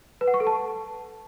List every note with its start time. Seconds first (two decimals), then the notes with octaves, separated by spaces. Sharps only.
0.21 B4
0.27 F#5
0.34 C#6
0.40 A4
0.47 A5